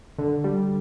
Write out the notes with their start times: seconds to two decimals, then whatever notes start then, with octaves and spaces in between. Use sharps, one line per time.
0.19 D3
0.44 G3